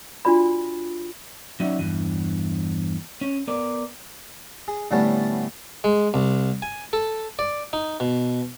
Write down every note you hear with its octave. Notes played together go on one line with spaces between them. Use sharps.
D4 F4 F#4 D5 B5
F#3 C#4 D#4 F#4 D5 E5
E2 G2 E3
C#4
B3 A#4 D5
G#4
A2 D3 G3 A3 B3 C#4
G#3
C2
G#5
A4
D5
D#4
B2